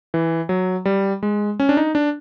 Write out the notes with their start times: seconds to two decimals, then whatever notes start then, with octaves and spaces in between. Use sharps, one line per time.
0.14 E3
0.49 F#3
0.85 G3
1.23 G#3
1.60 C#4
1.69 D4
1.77 D#4
1.95 D4